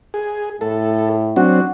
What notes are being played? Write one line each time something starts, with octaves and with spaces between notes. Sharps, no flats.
G#4
A2 A4
F#3 C4 D4 F#4